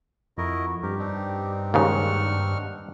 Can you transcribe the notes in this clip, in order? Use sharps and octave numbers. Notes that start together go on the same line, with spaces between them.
F2 E4 F#4 A#4 D#5
G2 G4 A#4
C4 D4 D#4
D#2 G#2 C#3 F#5 C#6 F6